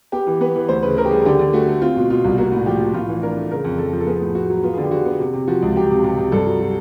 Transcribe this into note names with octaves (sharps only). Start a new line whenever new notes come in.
B3 G4
E3
B3 B4
E3
D2 C5
C#3 B4
C#3 A#4
G4
G3 G#4
D3 G4
D3
A3 F#4
A3
C4 F4
B2
B2 F4
C2
A#3 F#4
A2
F3 G4
F3
A2 F4
E3
D4 A#4
A3
C#3 A#4
F2
F2 A4
F3
A4
B3 G#4
A2
A2 F#4
F#3
B3 F4
G#4
D3
G4
D3 F#4
B3
C3
C3
F3 F#4
C#2
F#3 G4
C3
C3
C3
G2 A4
F#3
F#3